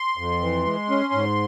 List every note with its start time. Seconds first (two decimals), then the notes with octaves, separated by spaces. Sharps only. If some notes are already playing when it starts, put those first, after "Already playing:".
Already playing: C6
0.17 F2
0.41 E3
0.66 G#3
0.90 C#4
1.13 G#2